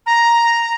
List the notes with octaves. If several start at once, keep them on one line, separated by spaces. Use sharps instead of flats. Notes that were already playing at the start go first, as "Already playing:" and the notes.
A#5